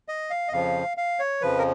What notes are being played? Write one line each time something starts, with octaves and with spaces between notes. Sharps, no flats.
D#5
F5
D#5
F2 C#3 F3 F5
F5
C#5
F2 C#3 F3 B4
A#4